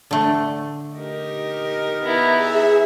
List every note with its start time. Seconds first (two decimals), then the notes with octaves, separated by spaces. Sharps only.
0.11 D3 A3
0.96 D#4 G4 A#4
2.02 B3 E4 A#5
2.33 G#4 E5